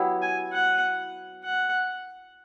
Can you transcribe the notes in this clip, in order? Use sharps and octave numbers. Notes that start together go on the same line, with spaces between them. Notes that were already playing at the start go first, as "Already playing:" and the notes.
Already playing: F#3 B3 E4 G4
G#5
F#5
F#5